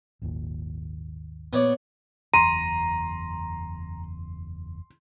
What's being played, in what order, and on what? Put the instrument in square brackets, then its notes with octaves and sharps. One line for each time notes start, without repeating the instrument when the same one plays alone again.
[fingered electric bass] G#1 D#2 A#2
[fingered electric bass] A#2 [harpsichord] B3 C#5 D5
[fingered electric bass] F#1 E2 [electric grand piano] A#5 [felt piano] C6 [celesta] D#7